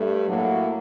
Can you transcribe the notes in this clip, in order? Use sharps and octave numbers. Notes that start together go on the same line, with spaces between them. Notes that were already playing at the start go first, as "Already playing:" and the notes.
Already playing: G2 A3
A2 F#3 A#3 F#4